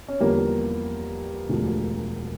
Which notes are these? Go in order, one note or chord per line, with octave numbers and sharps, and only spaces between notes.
C#4
E2 D3 F3 G3 A#3
E1 D2 D3 F3